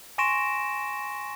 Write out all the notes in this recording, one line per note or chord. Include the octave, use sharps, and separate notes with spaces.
G#5 C6 C#6 A#6 D7 E7